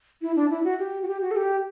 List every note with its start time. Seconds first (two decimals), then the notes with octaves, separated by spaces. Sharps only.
0.22 E4
0.36 D4
0.50 E4
0.64 F#4
0.79 G4
1.02 F#4
1.08 G4
1.22 F#4
1.31 A4
1.36 G4